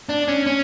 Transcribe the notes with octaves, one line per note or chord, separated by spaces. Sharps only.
D4
C#4
C#4